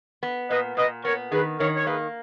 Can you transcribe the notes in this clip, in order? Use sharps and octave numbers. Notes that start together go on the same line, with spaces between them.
B3
A#2 B4 D#5
A#2 B4 D#5
B3 A#4 C#5
D#3 G#4 B4
D#3 A#4 C#5
C#5
A#3 G#4 B4